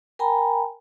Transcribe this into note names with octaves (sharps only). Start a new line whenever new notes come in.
A#4 G5 G#5 A#5 B5